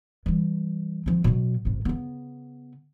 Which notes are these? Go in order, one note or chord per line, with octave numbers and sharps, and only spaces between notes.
E3 G3
F3 C4
B2 F#3
G#1 C3
C#3 B3